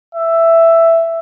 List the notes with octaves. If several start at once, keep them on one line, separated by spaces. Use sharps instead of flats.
E5